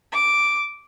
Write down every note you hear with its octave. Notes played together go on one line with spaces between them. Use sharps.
D6